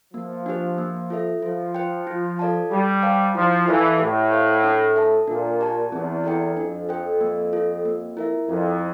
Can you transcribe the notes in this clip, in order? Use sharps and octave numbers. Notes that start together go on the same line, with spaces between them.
F3 A#3
D4 G4 C5
A#3
F4 A4 E5
F3 F4
C5 G5
F4
A4 D5 F5 A5
G3 G4
C5 F5 A5
F3 E4
E3 A4 D5 F5 A5
A2 G4
C5 F5
D4
A4 E5 A5
A#2 D4
G4 D5 A5
E2 C4
E4 A4 D5 G5
F2 D4
A4 C5 G5
A#3
F4 A4
A#3
E4 A#4 E5
F2 E4